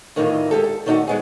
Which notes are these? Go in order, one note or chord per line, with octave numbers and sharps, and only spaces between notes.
E2 A2 D#3 E3 D#4 F4
G#3 G4 A4
A4
D#3 A3 D4 D#4 F#4
G#3 B3 G#4